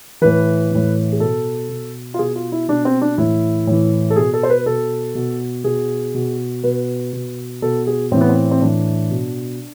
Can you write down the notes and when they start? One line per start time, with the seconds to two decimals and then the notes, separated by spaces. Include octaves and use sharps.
0.21 A2 E3 B4
0.71 A2 E3
1.12 G#4
1.20 B2 A4
1.69 B2
2.14 F4
2.19 B2 G#4
2.36 F4
2.52 E4
2.68 B2 D4
2.85 C4
3.01 D4
3.18 A2 E3 E4
3.67 A2 E3
4.10 A4
4.16 B2 G#4
4.34 A4
4.43 C5
4.50 B4
4.66 B2 A4
5.15 B2
5.64 B2 G#4
6.14 B2
6.64 B2 B4
7.13 B2
7.62 B2 A4
7.87 G#4
8.12 A2 E3 C4
8.21 B3
8.29 C4
8.51 C4
8.61 A2 E3 D4
9.11 B2